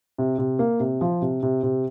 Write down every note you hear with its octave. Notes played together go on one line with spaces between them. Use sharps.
C3
C3
A#3
C3
F3
C3
C3
C3